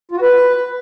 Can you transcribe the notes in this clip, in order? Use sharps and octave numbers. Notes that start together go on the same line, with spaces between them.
F4
F#4
B4